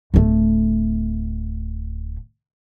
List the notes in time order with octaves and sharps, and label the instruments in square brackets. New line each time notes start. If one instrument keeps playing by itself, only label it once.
[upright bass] D1 A3